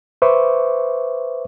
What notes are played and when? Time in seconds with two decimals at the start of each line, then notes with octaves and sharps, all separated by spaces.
0.22 B4 C5 E5 C#6 D6